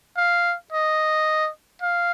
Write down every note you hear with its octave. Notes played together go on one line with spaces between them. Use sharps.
F5
D#5
F5